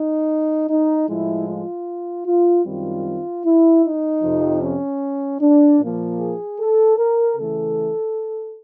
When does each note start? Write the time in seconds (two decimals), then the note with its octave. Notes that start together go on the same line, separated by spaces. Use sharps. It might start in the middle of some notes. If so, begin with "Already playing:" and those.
Already playing: D#4
0.68 D#4
1.07 A2 F3 G#3 E4
1.46 F4
2.25 F4
2.64 F#2 D#3 G3 C4 F4
3.44 E4
3.83 D#4
4.22 F2 C3 F3
4.61 C#4
5.40 D4
5.80 A#2 F3 A#3
6.19 G#4
6.59 A4
6.97 A#4
7.36 C#3 E3 A3 A4